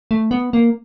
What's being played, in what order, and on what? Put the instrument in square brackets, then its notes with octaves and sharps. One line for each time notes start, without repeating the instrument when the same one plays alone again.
[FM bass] A3
B3
A#3